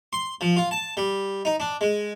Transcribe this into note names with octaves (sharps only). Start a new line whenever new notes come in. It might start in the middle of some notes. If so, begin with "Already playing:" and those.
C6
F3
F4
A5
G3
D#4
D4
G#3